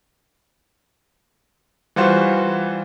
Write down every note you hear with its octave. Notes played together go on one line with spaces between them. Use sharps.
E3 G3 F4 F#4 C5